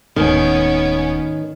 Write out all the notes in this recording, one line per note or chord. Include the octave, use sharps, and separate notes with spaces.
D#1 A2 D#3 B3 C#4